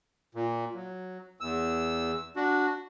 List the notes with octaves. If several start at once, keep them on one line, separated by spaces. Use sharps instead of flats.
A#2
F#3
E2 E6
D4 F#4